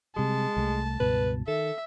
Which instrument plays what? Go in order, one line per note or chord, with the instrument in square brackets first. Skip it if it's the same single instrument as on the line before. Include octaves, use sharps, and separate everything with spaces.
[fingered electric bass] C3 G3 [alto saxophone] G#3 [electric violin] A5
[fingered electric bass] C2 G3 A3
[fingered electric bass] C#2 G2 B2 [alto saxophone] B4
[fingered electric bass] D#3 [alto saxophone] A4 [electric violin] E5